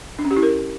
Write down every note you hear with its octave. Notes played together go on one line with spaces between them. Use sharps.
D4
C#4
G4
E4
A#4